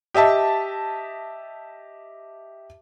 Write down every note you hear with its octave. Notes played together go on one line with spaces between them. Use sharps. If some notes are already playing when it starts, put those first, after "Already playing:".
G4 D#5 E5 A5